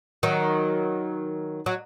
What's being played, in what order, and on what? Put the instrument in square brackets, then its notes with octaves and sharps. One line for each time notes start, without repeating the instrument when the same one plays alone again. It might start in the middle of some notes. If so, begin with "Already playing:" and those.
[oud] D#3 F#3
F#3